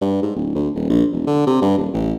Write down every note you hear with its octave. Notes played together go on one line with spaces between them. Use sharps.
G2
G#2
D1
D2
D#1
A#1
E1
D3
C3
G2
D#1
A1